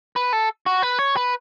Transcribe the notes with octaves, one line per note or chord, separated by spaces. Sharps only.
B4
A4
F#4
B4
C#5
B4